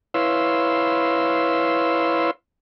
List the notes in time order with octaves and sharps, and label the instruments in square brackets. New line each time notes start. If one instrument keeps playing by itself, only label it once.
[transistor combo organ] E4 B4 C#5 F5 C6 E6